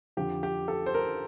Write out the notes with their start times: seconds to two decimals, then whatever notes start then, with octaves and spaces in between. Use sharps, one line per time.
0.17 F2 D3 F3 G4
0.43 G4
0.68 A4
0.86 C5
0.94 A#4